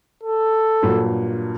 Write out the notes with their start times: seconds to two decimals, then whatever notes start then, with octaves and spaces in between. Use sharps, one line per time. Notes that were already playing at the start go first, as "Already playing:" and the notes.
0.23 A4
0.82 G2 A#2 F#3